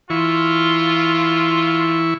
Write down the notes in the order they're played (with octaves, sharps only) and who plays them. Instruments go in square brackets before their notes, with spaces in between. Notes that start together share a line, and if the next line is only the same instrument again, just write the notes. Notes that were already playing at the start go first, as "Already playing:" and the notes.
[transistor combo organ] E3 E4 C#6 [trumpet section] F4